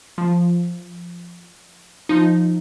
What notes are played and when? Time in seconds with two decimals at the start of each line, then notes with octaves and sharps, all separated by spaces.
0.18 F3
2.09 F3 D#4